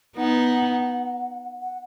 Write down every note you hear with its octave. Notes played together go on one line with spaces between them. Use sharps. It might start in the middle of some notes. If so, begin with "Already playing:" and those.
B3 D#4 F#5
F#5